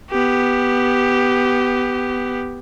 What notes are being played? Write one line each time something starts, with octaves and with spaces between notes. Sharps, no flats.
B3 G4